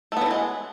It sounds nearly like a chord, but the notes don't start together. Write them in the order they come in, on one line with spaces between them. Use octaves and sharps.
A3 B3 F#3 E3 G#3